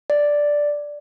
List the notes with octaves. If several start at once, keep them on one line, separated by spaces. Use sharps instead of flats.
D5